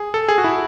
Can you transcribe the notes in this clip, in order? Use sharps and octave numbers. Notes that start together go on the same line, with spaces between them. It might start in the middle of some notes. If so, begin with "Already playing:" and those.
Already playing: G#4
A4
G#4
F#4
E4